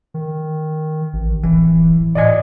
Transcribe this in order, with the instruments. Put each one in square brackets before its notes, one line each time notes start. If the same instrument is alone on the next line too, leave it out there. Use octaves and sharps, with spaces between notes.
[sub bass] D#3
A1
[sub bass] D1 [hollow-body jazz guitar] E3
[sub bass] A2 [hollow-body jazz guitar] D5 D#5 G#5